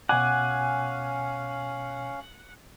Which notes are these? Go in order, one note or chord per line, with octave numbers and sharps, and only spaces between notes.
B2 C#4 F5 F#5 G#5 D6